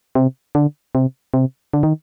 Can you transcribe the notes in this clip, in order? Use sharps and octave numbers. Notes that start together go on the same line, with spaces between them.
C3
D3
C3
C3
D3
D#3